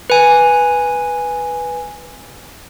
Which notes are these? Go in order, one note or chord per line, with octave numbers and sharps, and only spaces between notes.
B4 G#5